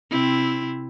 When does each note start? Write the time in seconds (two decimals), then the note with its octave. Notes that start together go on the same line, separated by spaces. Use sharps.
0.10 C3 C4 E4